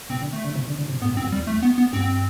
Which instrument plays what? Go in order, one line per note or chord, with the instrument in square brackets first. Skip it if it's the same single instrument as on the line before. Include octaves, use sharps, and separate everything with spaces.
[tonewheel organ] B2 [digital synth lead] C4
[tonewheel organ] D3
[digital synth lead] A3
[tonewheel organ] D3
C3
D3
D3
C3
[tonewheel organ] A2 [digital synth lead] B3
[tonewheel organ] G2
[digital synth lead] C4
[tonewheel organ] F#2
[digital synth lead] G3
[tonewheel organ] E2
[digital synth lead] A3
B3
B3
[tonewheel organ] G2 [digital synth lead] C4